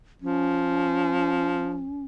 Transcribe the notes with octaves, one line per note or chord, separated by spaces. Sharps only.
F3 C#4